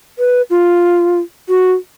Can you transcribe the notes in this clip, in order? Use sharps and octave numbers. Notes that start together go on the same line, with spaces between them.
B4
F4
F#4